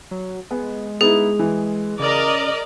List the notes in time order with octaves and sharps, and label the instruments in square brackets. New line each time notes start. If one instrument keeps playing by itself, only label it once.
[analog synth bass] F#3
[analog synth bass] G#3 [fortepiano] B3
[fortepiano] B3 D#4 E4 [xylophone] G#4
[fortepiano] E3
[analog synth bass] C#3 [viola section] A#4 D5 D#5